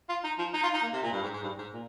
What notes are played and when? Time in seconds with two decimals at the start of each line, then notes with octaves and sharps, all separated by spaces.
0.09 F4
0.24 D#4
0.38 F3
0.53 D#4
0.63 F4
0.73 D#4
0.83 A#3
0.93 C3
1.03 A#2
1.12 G2
1.22 G#2
1.33 G#2
1.43 G2
1.58 G#2
1.73 A#2